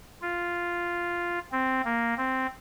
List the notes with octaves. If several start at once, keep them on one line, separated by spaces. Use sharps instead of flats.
F4
C4
A#3
C4